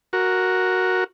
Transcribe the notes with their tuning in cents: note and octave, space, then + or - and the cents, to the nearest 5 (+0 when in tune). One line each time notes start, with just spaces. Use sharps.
F#4 +0 A#4 +0